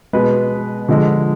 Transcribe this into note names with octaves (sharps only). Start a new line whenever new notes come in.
B2 G#3 B4
D3 F3 G#3